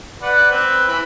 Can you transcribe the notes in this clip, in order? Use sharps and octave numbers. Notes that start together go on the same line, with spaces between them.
B4 D5 F#5
C4 B4
E3 B5